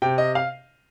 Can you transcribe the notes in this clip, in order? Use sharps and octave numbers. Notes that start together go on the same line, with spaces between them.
C3 G5
D#5
F5